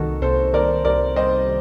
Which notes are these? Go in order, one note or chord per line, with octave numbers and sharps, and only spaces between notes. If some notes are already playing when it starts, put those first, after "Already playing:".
Already playing: C2 D#3 F#4 A4
C2 A4 C5
D#3 A#4 D5
C2 A#4 D5
G3 C5 D#5